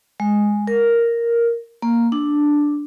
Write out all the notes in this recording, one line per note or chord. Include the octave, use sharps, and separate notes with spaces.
G#3
A#4
A#3
D4